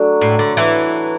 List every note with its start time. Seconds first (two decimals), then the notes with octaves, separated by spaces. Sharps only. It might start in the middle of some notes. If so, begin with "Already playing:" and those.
Already playing: F#3 A3 D4
0.21 A2
0.39 D3
0.57 E3